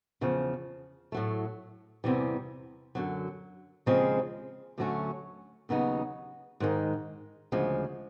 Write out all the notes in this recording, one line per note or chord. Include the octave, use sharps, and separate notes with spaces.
E2 C#3 F3
A2 F#3 A3
E2 C3 E3 G3
F#2 D3 F#3
D#2 C#3 F3 G#3 C4
D2 D3 F#3 A3 C#4
D#2 C#3 F#3 B3 D#4
G#2 D#3 G#3
D2 C#3 F3 G#3